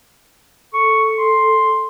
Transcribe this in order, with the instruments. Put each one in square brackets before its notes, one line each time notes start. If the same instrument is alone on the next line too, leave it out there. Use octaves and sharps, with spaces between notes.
[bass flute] A4 [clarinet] C#6
[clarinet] C6